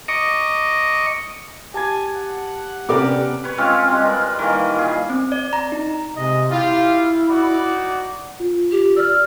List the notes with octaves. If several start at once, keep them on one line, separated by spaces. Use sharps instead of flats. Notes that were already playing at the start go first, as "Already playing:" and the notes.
D#5 A#5 C#6 D6
G4 G#5 A5 G#6
F#5
C3 B3 C#4 G4 A#4 B4 D5 D6
B4 C#5
G#3 C4 C#4 F4
G3 G#3 C4
A#4 B4
D#3 E3 G3 A#3
A#2 G#4
C4
D5
A#5
D#4
C3 G#3 D#5
E4 F4 G4 F5
D#4 F#4 D5
F4
G4
D5 E6 F6